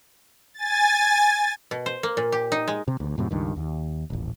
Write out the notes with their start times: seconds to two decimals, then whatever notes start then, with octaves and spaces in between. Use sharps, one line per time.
0.54 G#5 A6
1.71 B2
1.86 C5
2.03 A#3
2.17 A#2
2.32 G4
2.52 D#4
2.68 G#3
2.88 C3
3.00 D2
3.18 F#2 A2 C3
3.31 C#2 G2 D#3
3.56 D#2
4.10 D#1 A1